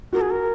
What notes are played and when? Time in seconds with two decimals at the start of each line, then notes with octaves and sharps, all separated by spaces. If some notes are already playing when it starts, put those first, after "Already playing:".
0.12 F#4 A#4
0.21 G#4
0.30 A#4